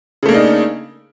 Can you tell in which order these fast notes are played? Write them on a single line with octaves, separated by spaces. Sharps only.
C#3 A3 A#3 D4 D#4